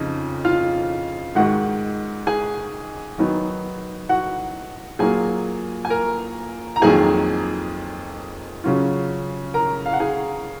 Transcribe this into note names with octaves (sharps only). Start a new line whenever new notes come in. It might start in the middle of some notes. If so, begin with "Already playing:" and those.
Already playing: F2 C#3 F3 D#4 D#5
F4 F5
G#2 D#3 G#3 F#4 F#5
G#4 G#5
D#3 F#3 B3 D#4
F#4 F#5
A#2 F#3 A#3 F4 G#4 G#5
G#5
A#4 A#5
A#5
F2 D#3 F#3 A#3 G#4 G#5
C#3 F#3 C#4 F4
A#4 A#5
F5
F#5
G#4 G#5